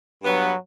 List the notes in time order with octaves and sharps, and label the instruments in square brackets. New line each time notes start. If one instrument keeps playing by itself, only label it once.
[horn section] G2 F#3 B3